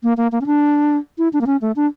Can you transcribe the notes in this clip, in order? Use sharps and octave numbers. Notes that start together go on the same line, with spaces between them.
A#3
A#3
A#3
C#4
D4
E4
D4
A#3
C#4
A3
D4